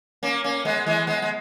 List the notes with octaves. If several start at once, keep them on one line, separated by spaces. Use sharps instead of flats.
A#3 C#4
A#3 C#4
G#3 B3
E3 G#3
G#3 B3
G#3